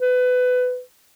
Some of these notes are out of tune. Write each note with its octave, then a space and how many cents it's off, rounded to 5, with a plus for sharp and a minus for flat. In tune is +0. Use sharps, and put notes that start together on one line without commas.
B4 +20